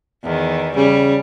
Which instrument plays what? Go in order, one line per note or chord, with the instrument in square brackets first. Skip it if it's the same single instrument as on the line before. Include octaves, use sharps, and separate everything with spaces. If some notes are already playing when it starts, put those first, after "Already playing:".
[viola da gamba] E2 D#3
[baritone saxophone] C#3 [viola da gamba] G3